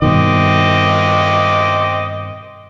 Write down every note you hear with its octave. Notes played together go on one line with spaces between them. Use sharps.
G2 B2 D#3 C4 D#5 D6